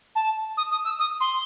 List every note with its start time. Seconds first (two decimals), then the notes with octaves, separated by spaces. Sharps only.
0.15 A5
0.57 D#6
0.71 D#6
0.85 E6
0.99 D#6
1.20 C6